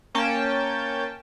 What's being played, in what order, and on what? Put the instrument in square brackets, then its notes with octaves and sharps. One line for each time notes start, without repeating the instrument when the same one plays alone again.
[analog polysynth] A#3 C#4 G5 A5